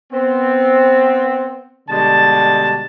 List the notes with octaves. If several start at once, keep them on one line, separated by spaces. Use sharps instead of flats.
B3 C4
B2 D3 G3 G#3 A5